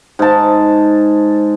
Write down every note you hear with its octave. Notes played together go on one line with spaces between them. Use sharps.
G#2 A5